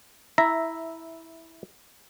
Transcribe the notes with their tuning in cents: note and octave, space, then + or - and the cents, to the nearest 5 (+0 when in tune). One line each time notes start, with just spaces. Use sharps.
E4 -10 E5 +0 A#5 +0